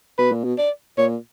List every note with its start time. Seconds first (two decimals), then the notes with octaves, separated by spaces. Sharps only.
0.19 B2 B4
0.32 A#2
0.44 B2
0.58 D5
0.98 A#2 C#5